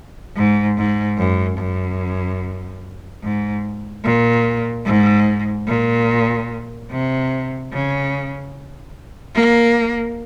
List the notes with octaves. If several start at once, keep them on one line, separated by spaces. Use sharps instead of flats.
G#2
G#2
F#2
F#2
G#2
A#2
G#2
A#2
C3
C#3
A#3